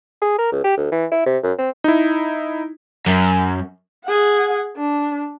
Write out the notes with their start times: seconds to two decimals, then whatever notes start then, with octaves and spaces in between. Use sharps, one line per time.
0.22 G#4
0.38 A#4
0.52 C#2
0.64 G4
0.77 D2
0.92 E3
1.12 E4
1.26 C3
1.43 F#2
1.58 C4
1.84 D#4 E4
3.07 F#2
4.05 G#4 F#5
4.76 D4